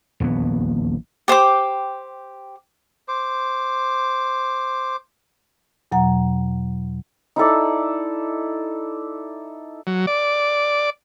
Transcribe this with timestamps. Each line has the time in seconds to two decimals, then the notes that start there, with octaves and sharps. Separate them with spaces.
0.20 D#1 A#1 E2 B3
1.28 G4 C5 G5 D6
3.08 C5 D6
5.92 E2 B2 F#3 F#5 A#5
7.36 D#4 E4 A4 D5
9.87 F#3
10.07 D5